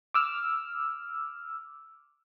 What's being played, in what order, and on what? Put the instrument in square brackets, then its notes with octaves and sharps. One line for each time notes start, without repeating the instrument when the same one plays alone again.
[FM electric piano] D6 E6 F6